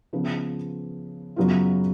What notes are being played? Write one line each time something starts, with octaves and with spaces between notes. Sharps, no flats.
C#3 F3 B3
F#2 C#3 F#3 B3 F4